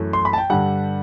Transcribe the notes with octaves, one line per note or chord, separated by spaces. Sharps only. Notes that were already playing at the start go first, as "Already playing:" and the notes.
Already playing: F#2 E3 A3
C6
B5
A5
G5
G2 D3 G3 F#5